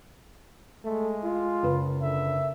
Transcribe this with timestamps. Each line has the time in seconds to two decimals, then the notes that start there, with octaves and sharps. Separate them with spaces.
0.84 G#3 A3
1.24 F4
1.63 F#1 B4
2.02 D3 E5